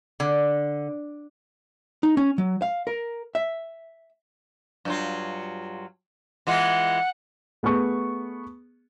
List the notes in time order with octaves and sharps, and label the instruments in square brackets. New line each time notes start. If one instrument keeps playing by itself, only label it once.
[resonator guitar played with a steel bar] D3
[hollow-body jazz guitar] D#4
C#4
F#3
F5
A#4
E5
[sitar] G2 F#3 F4
[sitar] E3 G#3 F4 [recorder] F#5
[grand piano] A3 B3 G#4 C#6